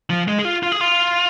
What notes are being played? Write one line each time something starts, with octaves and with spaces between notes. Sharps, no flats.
F3
G#3
G#4
F4
F4
G#4
F4